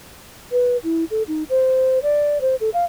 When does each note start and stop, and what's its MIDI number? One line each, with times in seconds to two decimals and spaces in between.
0.52 0.77 71
0.83 1.04 64
1.11 1.23 69
1.28 1.43 63
1.50 1.99 72
2.02 2.38 74
2.41 2.55 72
2.60 2.70 69
2.74 2.85 77